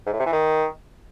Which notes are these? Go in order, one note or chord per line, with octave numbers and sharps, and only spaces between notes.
G#2
A2
C3
E3
D#3